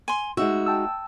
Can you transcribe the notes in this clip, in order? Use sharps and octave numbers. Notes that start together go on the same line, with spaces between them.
G#5 C6
G#3 D#4 F#4 E5
G5 A5 E6